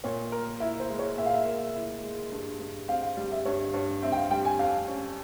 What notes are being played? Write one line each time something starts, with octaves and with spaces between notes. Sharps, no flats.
A#2 C#5
A#4
E4 E5
C5
G#3
C#5
A#2 E5
F5
E5
A#4
E4
G#3
G2
G2
C4 F5
F5
G3
E5
G2 C#5
G2 C#5
C4 E5
G5
F5
G3 G5
G#5
F2 F5
C#4